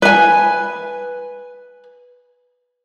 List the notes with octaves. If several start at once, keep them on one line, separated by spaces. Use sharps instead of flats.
B4 G#5